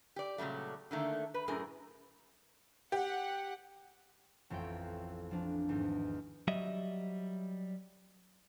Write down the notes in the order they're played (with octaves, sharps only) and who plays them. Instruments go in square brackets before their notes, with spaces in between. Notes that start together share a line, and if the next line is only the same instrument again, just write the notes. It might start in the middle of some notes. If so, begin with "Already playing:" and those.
[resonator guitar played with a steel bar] G4 D5
A#2 C#3 F#3 G3 A3
D3 D#3 A3 A#3
B4
F#2 A2 D4 G#4 A#4
[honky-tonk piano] G4 [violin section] F#5
[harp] A1 F2 A3 F4 G5
F3 D4
G#1 E2 G#2
[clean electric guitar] F#3 G3 D#5 E5